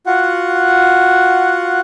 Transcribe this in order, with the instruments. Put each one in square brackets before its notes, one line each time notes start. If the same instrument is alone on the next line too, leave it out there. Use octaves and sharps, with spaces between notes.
[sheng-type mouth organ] F4 F#4 F#5